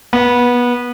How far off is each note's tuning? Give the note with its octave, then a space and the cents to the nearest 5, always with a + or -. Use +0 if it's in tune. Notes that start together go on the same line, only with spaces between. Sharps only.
B3 -20